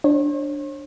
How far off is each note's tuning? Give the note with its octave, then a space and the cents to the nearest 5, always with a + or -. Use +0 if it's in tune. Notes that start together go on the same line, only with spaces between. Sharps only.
D4 +0 C#5 -45